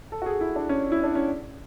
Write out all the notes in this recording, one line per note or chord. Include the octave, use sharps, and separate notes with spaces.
A4
F#4
G#4
E4
D4
C#4
E4
D4
C#4